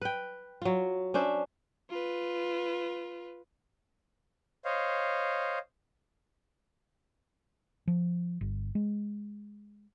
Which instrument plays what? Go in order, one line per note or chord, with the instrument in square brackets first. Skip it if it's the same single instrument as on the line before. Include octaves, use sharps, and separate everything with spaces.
[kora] B4 G5
F#3 F4
C#4 D4 C5 E5
[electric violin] F4 B4
[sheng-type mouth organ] C5 C#5 D#5 F5
[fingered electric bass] F3
G1
G#3